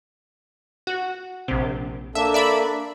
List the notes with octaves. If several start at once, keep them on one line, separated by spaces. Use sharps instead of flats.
F#4
A#1 C3
A#3 D4 A4 E5
D5 E5 B5